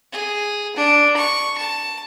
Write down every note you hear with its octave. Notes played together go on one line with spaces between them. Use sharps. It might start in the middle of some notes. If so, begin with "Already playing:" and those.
G#4
D4
C#6
A5